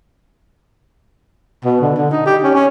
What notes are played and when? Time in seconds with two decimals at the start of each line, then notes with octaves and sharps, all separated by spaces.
1.65 B2
1.81 D3
1.96 D3
2.11 D#4
2.26 G4
2.43 C#4
2.54 C#4